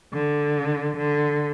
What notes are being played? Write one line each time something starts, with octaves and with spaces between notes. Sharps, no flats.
D3
D3